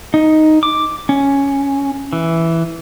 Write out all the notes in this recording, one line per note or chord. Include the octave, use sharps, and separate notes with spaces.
D#4
D6
C#4
E3